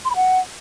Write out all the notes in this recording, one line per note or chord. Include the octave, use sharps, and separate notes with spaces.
C6
B5
F#5